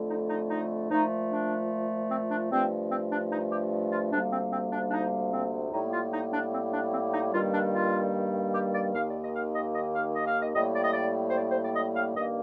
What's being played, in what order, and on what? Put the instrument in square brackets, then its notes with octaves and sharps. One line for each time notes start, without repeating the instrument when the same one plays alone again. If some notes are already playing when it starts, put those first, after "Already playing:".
Already playing: [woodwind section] F2 D3 A3
D#4
D#4
D#4
A#2 F3 A3 D#4
D4
C4
D4
G2 F3 A3 C4
C4
D4
D#4
G4
F4
D2 C3 G3 A#3 D4
C4
C4
D4
D4
D#4
C4
A2 G3 A#3 D#4
F4
D#4
D4
C4
D4
C4
D#4
G2 D#3 G3 A#3 F4
D4
F4
G4
D5
D#2 D#3 A#3 F5
D5
D#5
F5
D#5
D#5
F5
D#5
F5
D#5
A2 G3 A#3 D#5
D5
D#5
D5
C5
D5
C5
D5
D#5
F5
G2 D#3 A#3 D#5